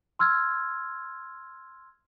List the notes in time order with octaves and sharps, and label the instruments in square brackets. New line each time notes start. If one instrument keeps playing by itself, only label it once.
[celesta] C6 E6 F6 G#6